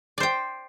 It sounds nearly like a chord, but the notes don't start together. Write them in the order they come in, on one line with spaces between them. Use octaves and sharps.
D5 C5 G5